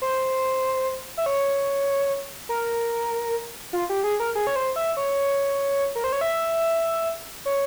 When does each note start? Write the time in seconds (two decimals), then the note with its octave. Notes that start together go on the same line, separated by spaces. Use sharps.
0.02 C5
1.17 E5
1.26 C#5
2.49 A#4
3.73 F4
3.89 G4
4.04 G#4
4.20 A#4
4.35 G#4
4.47 C#5
4.56 C5
4.76 E5
4.97 C#5
5.95 A#4
6.04 C5
6.13 C#5
6.21 E5
7.45 C#5